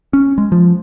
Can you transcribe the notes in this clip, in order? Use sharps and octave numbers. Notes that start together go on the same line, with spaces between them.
C#4
G#3
F3